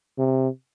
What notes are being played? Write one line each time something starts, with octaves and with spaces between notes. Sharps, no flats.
C3